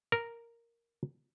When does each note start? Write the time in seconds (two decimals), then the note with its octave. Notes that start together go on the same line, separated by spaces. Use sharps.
0.12 A#4